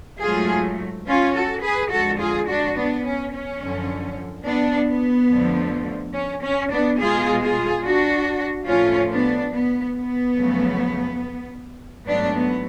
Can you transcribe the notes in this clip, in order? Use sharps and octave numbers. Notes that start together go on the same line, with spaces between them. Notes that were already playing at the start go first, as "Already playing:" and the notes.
G#2 F#3 A3 F4 G#4
C#4 F4
F#4 A4
G#4 B4
F2 D3 G#3 F#4 A4
F4 G#4
D4 F#4
B3 D4
C#4
C#4
F#2 D3 F3
B3 D4
B3
F2 D3 F3 A3
C#4
C#4
B3 D4
B2 G#3 F4 G#4
F4 G#4
D4 F#4
A2 F3 A3 C#4 F4
B3 D4
B3
B3
F2 C#3 F#3 A3
G#2 F#3 A3 B3 D4
B3